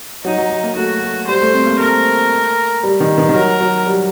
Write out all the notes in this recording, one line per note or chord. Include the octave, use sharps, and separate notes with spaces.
F#3 D#4
F#3
F#3
A#3
A3 F#4
A3
G3 C5
A3
C4
A#3
A3 A#4
G3
D#3
D#3
D#3
F#3 A#4
F#3
G3